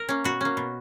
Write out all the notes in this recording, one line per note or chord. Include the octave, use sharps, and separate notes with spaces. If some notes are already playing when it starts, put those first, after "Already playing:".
Already playing: A#4
A#3 C#4
B2 F#4
A#3 C#4
B2